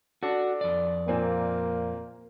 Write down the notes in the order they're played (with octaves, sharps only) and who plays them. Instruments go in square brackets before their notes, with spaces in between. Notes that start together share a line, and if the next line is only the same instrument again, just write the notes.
[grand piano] D4 A4 [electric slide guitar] F#4
[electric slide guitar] F2 D5
[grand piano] A#2 C4 G#5 [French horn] A#3